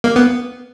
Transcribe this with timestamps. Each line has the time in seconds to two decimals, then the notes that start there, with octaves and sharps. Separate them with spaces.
0.04 A#3
0.16 B3